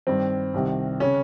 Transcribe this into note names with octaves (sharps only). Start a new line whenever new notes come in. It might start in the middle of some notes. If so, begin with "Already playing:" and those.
G2 D#3 C4
C2 C3 D#3
C#3 C#4